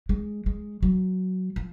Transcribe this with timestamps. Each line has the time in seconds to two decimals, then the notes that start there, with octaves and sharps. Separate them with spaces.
0.09 G#3
0.46 G#3
0.83 F#3
1.56 F3